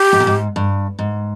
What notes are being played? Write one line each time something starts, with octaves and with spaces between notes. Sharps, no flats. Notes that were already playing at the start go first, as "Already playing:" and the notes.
Already playing: G4
G#2
A#2
G#2
G2
G#2